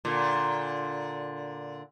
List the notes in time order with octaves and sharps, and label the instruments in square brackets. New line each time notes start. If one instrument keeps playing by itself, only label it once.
[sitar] A#2 D3